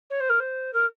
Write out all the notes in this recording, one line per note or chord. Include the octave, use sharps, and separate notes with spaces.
C#5
C5
A#4
C5
A#4